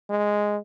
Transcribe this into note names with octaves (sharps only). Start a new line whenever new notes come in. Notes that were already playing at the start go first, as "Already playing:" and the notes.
G#3